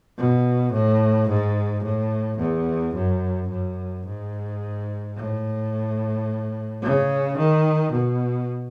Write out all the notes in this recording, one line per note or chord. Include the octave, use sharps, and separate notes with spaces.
B2
A2
G#2
A2
E2
F#2
F#2
G#2
A2
C#3
D#3
B2